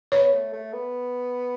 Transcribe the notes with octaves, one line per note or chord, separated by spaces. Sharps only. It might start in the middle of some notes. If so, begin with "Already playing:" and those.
B3 C#5
A3
A3
B3